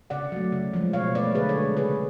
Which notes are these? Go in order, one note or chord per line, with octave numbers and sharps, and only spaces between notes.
C#3 D5 F#5
F#3 A3
C#3
F3 G#3
B2 C#5 F5
A3 B4 D5
D3 G#4 B4
A4 C#5
G#3
C#3 G#4 B4